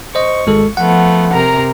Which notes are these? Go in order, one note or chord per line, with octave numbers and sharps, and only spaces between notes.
C5 D#5 C#6
G#1 G#3 A4
F3 A3 B3 F#5
C3 A#4 A#5